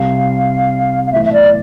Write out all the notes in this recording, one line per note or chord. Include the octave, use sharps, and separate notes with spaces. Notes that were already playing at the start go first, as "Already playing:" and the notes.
Already playing: C2 C3 G3 F5
F5
B1 A2 E3 E5
E5
D5